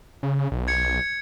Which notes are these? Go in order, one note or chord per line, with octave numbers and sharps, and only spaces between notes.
C#3
B1
G#6 C#7